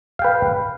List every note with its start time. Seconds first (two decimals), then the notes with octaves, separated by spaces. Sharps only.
0.19 F5
0.22 G5
0.24 B4